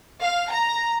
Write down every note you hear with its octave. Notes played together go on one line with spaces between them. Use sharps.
F5
A#5